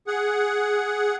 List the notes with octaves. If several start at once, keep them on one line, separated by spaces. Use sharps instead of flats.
G#4 F#5